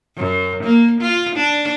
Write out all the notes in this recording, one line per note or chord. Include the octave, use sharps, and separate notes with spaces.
F#2
A#3
F4
D4